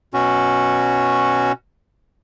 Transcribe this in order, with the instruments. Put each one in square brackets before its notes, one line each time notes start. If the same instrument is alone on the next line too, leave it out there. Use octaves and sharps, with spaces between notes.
[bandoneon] B2 C#4 F#4